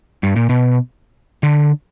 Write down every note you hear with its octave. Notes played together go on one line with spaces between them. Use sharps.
G2
A#2
B2
D3